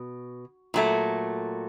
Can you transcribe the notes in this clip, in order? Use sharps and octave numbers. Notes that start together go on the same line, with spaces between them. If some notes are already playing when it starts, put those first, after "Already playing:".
Already playing: B2
A#2 F#3 A3